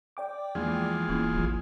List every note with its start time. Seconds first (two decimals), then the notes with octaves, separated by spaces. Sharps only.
0.17 D5 G5 D6
0.55 E2 F3 G#3 A#3 D4 F4 G#4
1.08 D1 A#3 C#4 E4
1.37 A1 F3